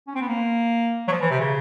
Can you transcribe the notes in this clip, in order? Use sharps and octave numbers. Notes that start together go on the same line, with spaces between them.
C#4
C4
B3
A#3
F#3
F3
E3
C3
C#3